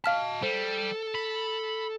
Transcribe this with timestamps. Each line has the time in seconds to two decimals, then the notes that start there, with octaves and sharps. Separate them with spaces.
0.04 D#5 F5 A5 F6 B6
0.43 G3 A4 C5
1.15 B5